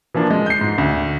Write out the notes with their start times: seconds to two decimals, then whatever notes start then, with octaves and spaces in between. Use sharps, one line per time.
0.14 E3 F3 A#3 D4
0.30 G#3
0.46 G6 C7
0.61 G#2
0.78 D2